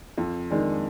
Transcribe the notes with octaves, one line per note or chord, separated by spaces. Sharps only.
F2
D#3 G#3 D4